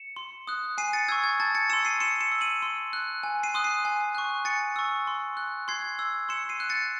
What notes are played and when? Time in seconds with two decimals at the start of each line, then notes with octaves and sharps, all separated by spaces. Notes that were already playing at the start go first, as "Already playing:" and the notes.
Already playing: C#7 E7
0.16 C6
0.47 D#6 F#6
0.78 G#5 C7 D#7
0.93 A6 C#7
1.08 C#6 E6 G#6
1.24 G#6
1.40 A5 A6
1.55 A6 C#7
1.69 C6 E6 C#7 E7
1.85 C7 D#7
2.00 C6 C#7 E7
2.21 C#7 E7
2.32 E6
2.41 D#7 F#7
2.62 C6
2.93 F#6
3.23 G#5
3.43 C7 D#7
3.54 C6 D#6 F#6
3.64 C7 D#7
3.85 G#5
4.15 C#6 F#6
4.45 G#5 A6 C#7
4.76 C#6 E6
5.07 C6
5.37 F#6
5.68 C6 G#6 C7
5.99 E6
6.29 C6 C#7 E7
6.49 C7 D#7
6.60 F#6
6.70 A6 C#7